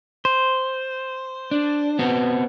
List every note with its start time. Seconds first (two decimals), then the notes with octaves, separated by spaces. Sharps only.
0.25 C5
1.51 D4
1.99 B3 C4 F#4